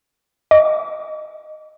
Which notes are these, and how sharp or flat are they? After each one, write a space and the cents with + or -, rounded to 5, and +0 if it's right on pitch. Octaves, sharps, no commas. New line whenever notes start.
D#5 -10 D6 -40